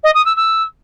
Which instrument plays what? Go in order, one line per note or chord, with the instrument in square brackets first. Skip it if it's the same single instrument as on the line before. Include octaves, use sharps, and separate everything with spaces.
[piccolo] D#5
D#6
E6
E6